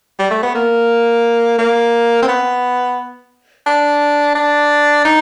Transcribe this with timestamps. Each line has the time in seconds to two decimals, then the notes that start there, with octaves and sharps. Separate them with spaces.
0.19 G3
0.31 A3
0.43 B3
0.55 A#3
1.58 A#3
2.23 C4
2.28 B3
3.67 D4
4.35 D4
5.05 D#4